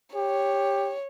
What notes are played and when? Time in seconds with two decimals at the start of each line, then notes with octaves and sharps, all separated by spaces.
0.15 G4 C#5